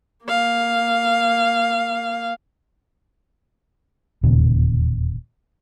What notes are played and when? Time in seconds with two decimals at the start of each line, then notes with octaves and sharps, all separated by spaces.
0.25 A#3 F5
4.23 E1 D#2 A#2 C#3